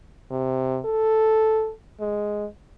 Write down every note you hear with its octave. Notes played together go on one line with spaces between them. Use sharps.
C3
A4
G#3